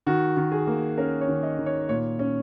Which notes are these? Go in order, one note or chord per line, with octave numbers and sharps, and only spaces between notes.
D#3 F#4
D#3
G#4
A#3
C#4 A#4
C#5
D#3
D#5
D#3
C#5
A#2 C#5
C#4